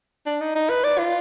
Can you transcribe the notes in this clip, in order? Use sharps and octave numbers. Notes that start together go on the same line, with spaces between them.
D4
D#4
D#4
B4
D5
F4